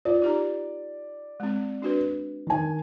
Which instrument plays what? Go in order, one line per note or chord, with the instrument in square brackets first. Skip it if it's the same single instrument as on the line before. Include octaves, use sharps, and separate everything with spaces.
[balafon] F4 [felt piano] D5
[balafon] D#4 G4 A#5
G#3 C4
D4 F#4 B4
[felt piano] D#3 G#5